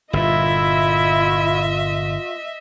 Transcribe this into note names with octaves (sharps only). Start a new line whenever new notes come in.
G1 A#2 E4 F4 D#5 E5